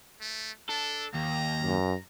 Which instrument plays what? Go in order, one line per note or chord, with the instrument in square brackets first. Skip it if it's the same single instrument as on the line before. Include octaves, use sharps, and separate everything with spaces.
[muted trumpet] A3
[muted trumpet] D4 [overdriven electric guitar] A4
[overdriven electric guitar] D#2 [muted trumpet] A#5
[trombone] F#2